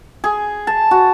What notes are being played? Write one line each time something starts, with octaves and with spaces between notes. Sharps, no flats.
G#4
A5
F#4